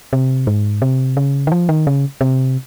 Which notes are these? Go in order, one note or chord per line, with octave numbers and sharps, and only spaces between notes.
C3
G#2
C3
C#3
D#3
F3
D#3
C#3
C3